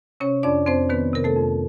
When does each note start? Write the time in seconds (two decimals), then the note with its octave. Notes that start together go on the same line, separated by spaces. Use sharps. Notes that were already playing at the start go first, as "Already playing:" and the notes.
0.20 C3 C#4 C#5
0.43 F2 D4 D5
0.66 F2 C4 C5
0.89 D#3 B3 B4
1.13 C3 A#4
1.24 A3 A4
1.36 F2